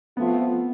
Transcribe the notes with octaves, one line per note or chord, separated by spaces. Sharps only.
F3 A3 B3 C4 F4